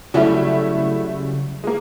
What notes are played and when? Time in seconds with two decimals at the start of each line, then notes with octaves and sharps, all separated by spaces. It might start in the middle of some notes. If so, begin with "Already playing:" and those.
0.14 C#3 F#3 G3 A3 C#4 E4 F#4
1.64 G#3 A#3